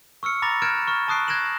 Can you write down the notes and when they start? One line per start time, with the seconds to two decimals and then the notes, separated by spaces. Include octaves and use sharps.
0.23 C#6 E6 F6 C#7
0.42 A#5 B5 D6 A6 A#6 F7
0.62 F6 F#6 G#6 D7 E7
0.88 C#6 F6
1.08 A5 C#6 D#6 F#6 C7 D7
1.28 F#6 G#6 A#6 D7 E7 F#7